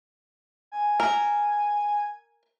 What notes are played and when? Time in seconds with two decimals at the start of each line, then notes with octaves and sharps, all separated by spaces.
0.72 G#5
1.00 A#4